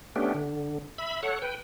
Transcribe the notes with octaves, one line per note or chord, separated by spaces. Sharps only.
A3 B3 C#4 D4 G4
D3
E5 B5
A4 C#5 F#5
B4 G5